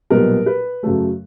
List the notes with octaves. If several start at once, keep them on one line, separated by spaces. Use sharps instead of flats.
B1 A#2 G3 B3 A#4
B4
F#2 C#3 F#3 A3 A4